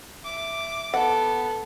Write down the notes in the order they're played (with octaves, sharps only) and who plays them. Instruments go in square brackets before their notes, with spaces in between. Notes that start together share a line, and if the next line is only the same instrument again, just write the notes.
[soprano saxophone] E5 [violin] D6
[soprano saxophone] B3 [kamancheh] A4 [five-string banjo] F#5